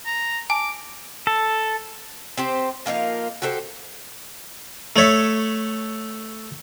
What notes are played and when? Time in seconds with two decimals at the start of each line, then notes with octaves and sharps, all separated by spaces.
0.06 A#5
0.50 G#5 A5 D6
1.27 A4
2.38 C4 G4 C5
2.86 F3 A#3 D#4 F5
3.42 F#4 G4 A4 C5
4.96 A3 A4 C#5 E5